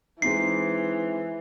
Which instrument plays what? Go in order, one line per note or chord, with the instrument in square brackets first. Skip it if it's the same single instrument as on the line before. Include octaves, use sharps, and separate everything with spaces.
[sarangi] E3 [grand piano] G#3 C4 D#4 [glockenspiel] C7